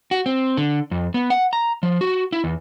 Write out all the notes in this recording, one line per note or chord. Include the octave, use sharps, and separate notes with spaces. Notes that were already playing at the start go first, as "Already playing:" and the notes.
F#4
C4
D3
F2
B3
F#5
A#5
F3
F#4
E4
E2